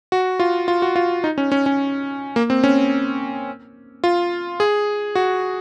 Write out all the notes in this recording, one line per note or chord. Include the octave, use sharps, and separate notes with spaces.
F#4
F4
F4
F#4
F4
D#4
C#4
C#4
C#4
A#3
C4
C#4
F4
G#4
F#4